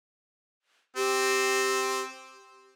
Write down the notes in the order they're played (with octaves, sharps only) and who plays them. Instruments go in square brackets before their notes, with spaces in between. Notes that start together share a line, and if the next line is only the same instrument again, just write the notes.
[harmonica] C4 [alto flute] G4